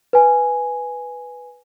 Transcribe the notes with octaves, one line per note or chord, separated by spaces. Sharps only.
B4 G#5